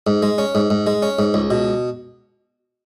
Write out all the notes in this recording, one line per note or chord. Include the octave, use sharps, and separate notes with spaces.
G#2
G#3
C#4
G#2
G#2
G#3
C#4
G#2
C#2
B2